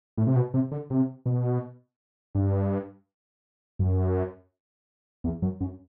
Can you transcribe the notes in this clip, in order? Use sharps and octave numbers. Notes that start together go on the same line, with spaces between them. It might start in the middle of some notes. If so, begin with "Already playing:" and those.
A2
C3
B2
C3
D3
C3
B2
G2
F#2
E2
F#2
F#2